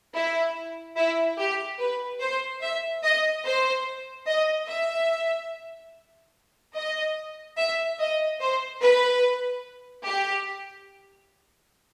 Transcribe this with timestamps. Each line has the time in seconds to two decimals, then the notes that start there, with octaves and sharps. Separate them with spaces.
0.14 E4
0.96 E4
1.38 G4
1.79 B4
2.20 C5
2.61 E5
3.03 D#5
3.45 C5
4.27 D#5
4.68 E5
6.75 D#5
7.58 E5
7.99 D#5
8.40 C5
8.81 B4
10.05 G4